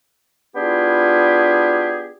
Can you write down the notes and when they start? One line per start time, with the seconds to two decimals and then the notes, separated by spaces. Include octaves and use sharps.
0.55 B3 D4 E4 F4 G4 G#4